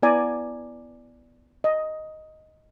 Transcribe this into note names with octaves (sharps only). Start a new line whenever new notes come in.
B3 E4 D5 G#5 A#5
D#5